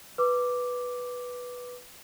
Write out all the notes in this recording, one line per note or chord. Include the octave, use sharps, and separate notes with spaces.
B4 D6